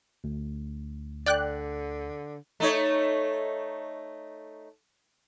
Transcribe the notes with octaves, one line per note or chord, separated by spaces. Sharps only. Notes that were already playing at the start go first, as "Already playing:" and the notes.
D2
D3 D5 G5 F#6
A3 D#4 C#5